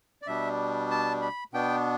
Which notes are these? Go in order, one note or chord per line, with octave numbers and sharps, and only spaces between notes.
D5
B2 G3 D4 E5
A5
B5
B2 B3 D4 G5